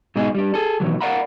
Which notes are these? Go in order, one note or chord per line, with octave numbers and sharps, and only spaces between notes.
G#2 B2 G#3 D#4 G#4
G3 D4
G#4 A4
B2 D#3 E3 F#3
A#4 D5 F5 F#5 A#5 B5